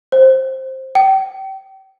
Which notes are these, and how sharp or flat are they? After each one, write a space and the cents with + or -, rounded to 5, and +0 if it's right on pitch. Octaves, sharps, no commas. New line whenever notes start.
C5 +10
G5 -30